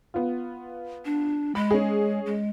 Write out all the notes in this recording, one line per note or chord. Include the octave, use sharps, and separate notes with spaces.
B3 F4
D4
G#3 B5
C#4 G#4
G#3